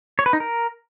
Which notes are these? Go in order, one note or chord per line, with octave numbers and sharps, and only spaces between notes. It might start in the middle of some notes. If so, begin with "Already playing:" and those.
C#5
B4
D#4
A#4